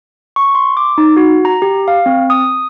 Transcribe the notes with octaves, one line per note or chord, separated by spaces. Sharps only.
C#6
C6
D6
D#4
F#4
A#5
G4
F5
C4
D#6